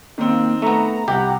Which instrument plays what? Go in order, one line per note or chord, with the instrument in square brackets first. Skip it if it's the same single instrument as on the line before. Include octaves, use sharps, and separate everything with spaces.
[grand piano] D#3 C4 [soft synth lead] A#3
[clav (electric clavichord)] A3 B3 [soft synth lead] A#5
[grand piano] C2 F#5 [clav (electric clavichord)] G4